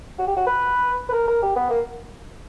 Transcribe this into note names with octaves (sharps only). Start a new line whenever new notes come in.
F#4
G4
F#4
B4
B4
A#4
A#4
G4
B3
A#3